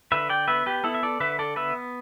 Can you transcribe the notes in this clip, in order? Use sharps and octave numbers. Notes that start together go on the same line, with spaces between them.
D3 B4 E5
D5 G5
B3 B4 E5
G4 B4
B3 E4 A4
E5
A4 D5
D3 B4 E5
A4 D5
B3 B4 E5